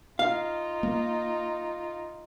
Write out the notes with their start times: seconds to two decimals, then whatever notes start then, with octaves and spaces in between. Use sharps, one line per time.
0.19 D#4 F4 F5
0.83 A#3